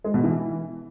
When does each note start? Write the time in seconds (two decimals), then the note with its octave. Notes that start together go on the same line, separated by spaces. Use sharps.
0.04 G#3
0.14 B2
0.23 E3